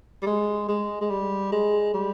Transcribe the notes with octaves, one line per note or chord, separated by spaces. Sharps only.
G3
G#3
G#3
G#3
G3
G#3
G3